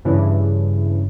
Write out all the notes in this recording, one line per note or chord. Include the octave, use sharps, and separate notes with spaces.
G2 C#3 E3